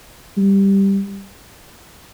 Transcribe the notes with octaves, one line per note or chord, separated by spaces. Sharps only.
G3